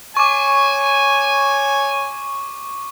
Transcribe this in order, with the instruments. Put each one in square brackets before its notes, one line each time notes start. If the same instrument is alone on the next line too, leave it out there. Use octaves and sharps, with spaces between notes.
[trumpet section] C#5 G#5 [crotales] C#6 D6